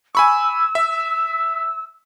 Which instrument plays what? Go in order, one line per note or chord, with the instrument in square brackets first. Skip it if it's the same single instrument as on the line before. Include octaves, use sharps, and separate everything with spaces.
[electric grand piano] G#5 B5 C#6 [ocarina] E6
[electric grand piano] E5